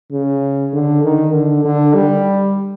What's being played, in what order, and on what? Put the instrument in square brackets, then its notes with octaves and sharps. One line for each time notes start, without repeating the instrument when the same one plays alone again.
[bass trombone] C#3
D3
D#3
D3
D3
G3